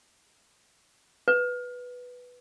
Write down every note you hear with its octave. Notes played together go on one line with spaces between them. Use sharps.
B4